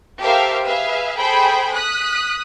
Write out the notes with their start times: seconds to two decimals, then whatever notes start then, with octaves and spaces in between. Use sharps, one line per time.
0.21 G4 A4 A#4 C5 E5 F5
0.64 G#4 B4 E5 F5
1.17 G#4 A4 C5 G5 B5
1.74 D#6 F#6 B6